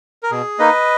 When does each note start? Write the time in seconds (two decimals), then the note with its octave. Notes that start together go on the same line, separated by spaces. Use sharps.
0.23 A#4
0.31 B2 G#4
0.59 A#3 D#4 B4 D#5